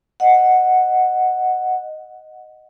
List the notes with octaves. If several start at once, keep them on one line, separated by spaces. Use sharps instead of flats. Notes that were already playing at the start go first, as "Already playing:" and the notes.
D#5 F#5